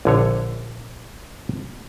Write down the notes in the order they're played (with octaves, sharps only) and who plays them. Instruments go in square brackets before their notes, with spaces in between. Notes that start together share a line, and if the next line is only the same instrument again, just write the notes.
[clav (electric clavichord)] A#1 D3 C#5